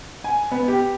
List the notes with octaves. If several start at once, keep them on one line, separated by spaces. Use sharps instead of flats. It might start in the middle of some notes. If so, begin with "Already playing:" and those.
G#5
B3
G4